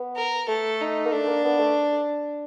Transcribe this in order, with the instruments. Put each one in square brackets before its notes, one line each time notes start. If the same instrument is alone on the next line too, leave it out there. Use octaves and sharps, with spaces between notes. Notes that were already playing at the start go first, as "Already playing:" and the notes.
Already playing: [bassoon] B3
[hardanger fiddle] A#4
[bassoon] A3 [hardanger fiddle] A4
[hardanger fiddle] D#4
[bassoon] A#3
[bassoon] A3 [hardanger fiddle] D4
[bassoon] A#3
B3
A3